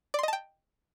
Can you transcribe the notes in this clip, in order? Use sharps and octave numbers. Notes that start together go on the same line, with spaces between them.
D5 D#5 G5 A5 C6